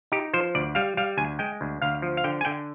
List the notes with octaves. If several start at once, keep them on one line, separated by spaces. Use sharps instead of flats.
D#4 G4
F3 C5
D2 D5
G3 F5
G3 F5
D2 G#5
G#3 G5
D2
D2 F5
F3
F5
D3 G5
G#5
D3 G5